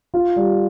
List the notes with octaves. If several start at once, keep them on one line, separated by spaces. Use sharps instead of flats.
F4
G3